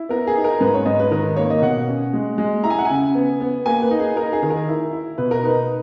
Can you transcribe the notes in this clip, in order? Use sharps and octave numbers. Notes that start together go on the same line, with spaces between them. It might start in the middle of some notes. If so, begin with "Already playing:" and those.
Already playing: E4
B3 A#4
G#4
D#4
A#4
G#2 B4
C#5
G#2 D#5
B4
D#3 A#4
A#3 C#5
D#5
B2 F#5
C#4
G#3
G#3
E4 A#5
G#5
F#5
C#3 G#5
B3
B3
A#3 G#5
B4
D#4
G#4
D#4 A#4
G#4
D#3
A#4
E4
E4
B2 B4
A#4
D#4 B4